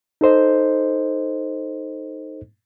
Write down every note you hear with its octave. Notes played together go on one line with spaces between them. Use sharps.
D#4 A4 C5 D#5